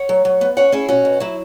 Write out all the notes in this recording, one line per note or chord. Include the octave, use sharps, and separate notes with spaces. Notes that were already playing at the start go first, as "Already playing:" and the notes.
Already playing: C#5 F#5
F#3
F#3
B3
C#4 C#5 F#5
C#4 E4 G#4
B2 C#4 F#4
B2
F#3 E4